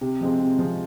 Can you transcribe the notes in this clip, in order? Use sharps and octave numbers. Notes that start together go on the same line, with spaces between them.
C3
F3 G#3 C4
C3
F3 G#3 C4